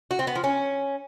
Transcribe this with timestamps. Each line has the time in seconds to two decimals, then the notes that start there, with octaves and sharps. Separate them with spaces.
0.11 F#4
0.19 C4
0.27 B3
0.35 F3
0.44 C#4